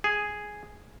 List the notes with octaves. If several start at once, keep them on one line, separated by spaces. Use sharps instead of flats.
G#4